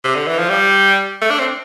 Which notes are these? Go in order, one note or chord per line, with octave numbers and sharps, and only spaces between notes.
C3
D3
E3
F3
G3
A3
D4
C4